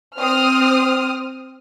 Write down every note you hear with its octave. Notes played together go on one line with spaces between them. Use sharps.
C4 D#6 F6